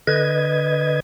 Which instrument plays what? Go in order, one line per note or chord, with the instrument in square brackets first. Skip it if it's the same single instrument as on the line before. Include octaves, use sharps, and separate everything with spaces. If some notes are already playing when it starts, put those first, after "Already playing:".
[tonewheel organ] D3 B4 D#5 G#6